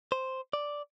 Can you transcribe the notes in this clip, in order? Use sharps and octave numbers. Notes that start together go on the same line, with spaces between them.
C5
D5